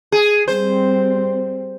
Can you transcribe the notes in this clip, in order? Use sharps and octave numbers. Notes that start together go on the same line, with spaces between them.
G#4
G3 C4 C5